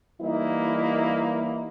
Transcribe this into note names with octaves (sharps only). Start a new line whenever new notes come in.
E3 G3 A#3 D#4 E4